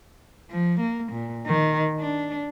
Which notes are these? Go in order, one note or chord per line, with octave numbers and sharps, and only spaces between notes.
F3
A#3
A#2
D#3
D4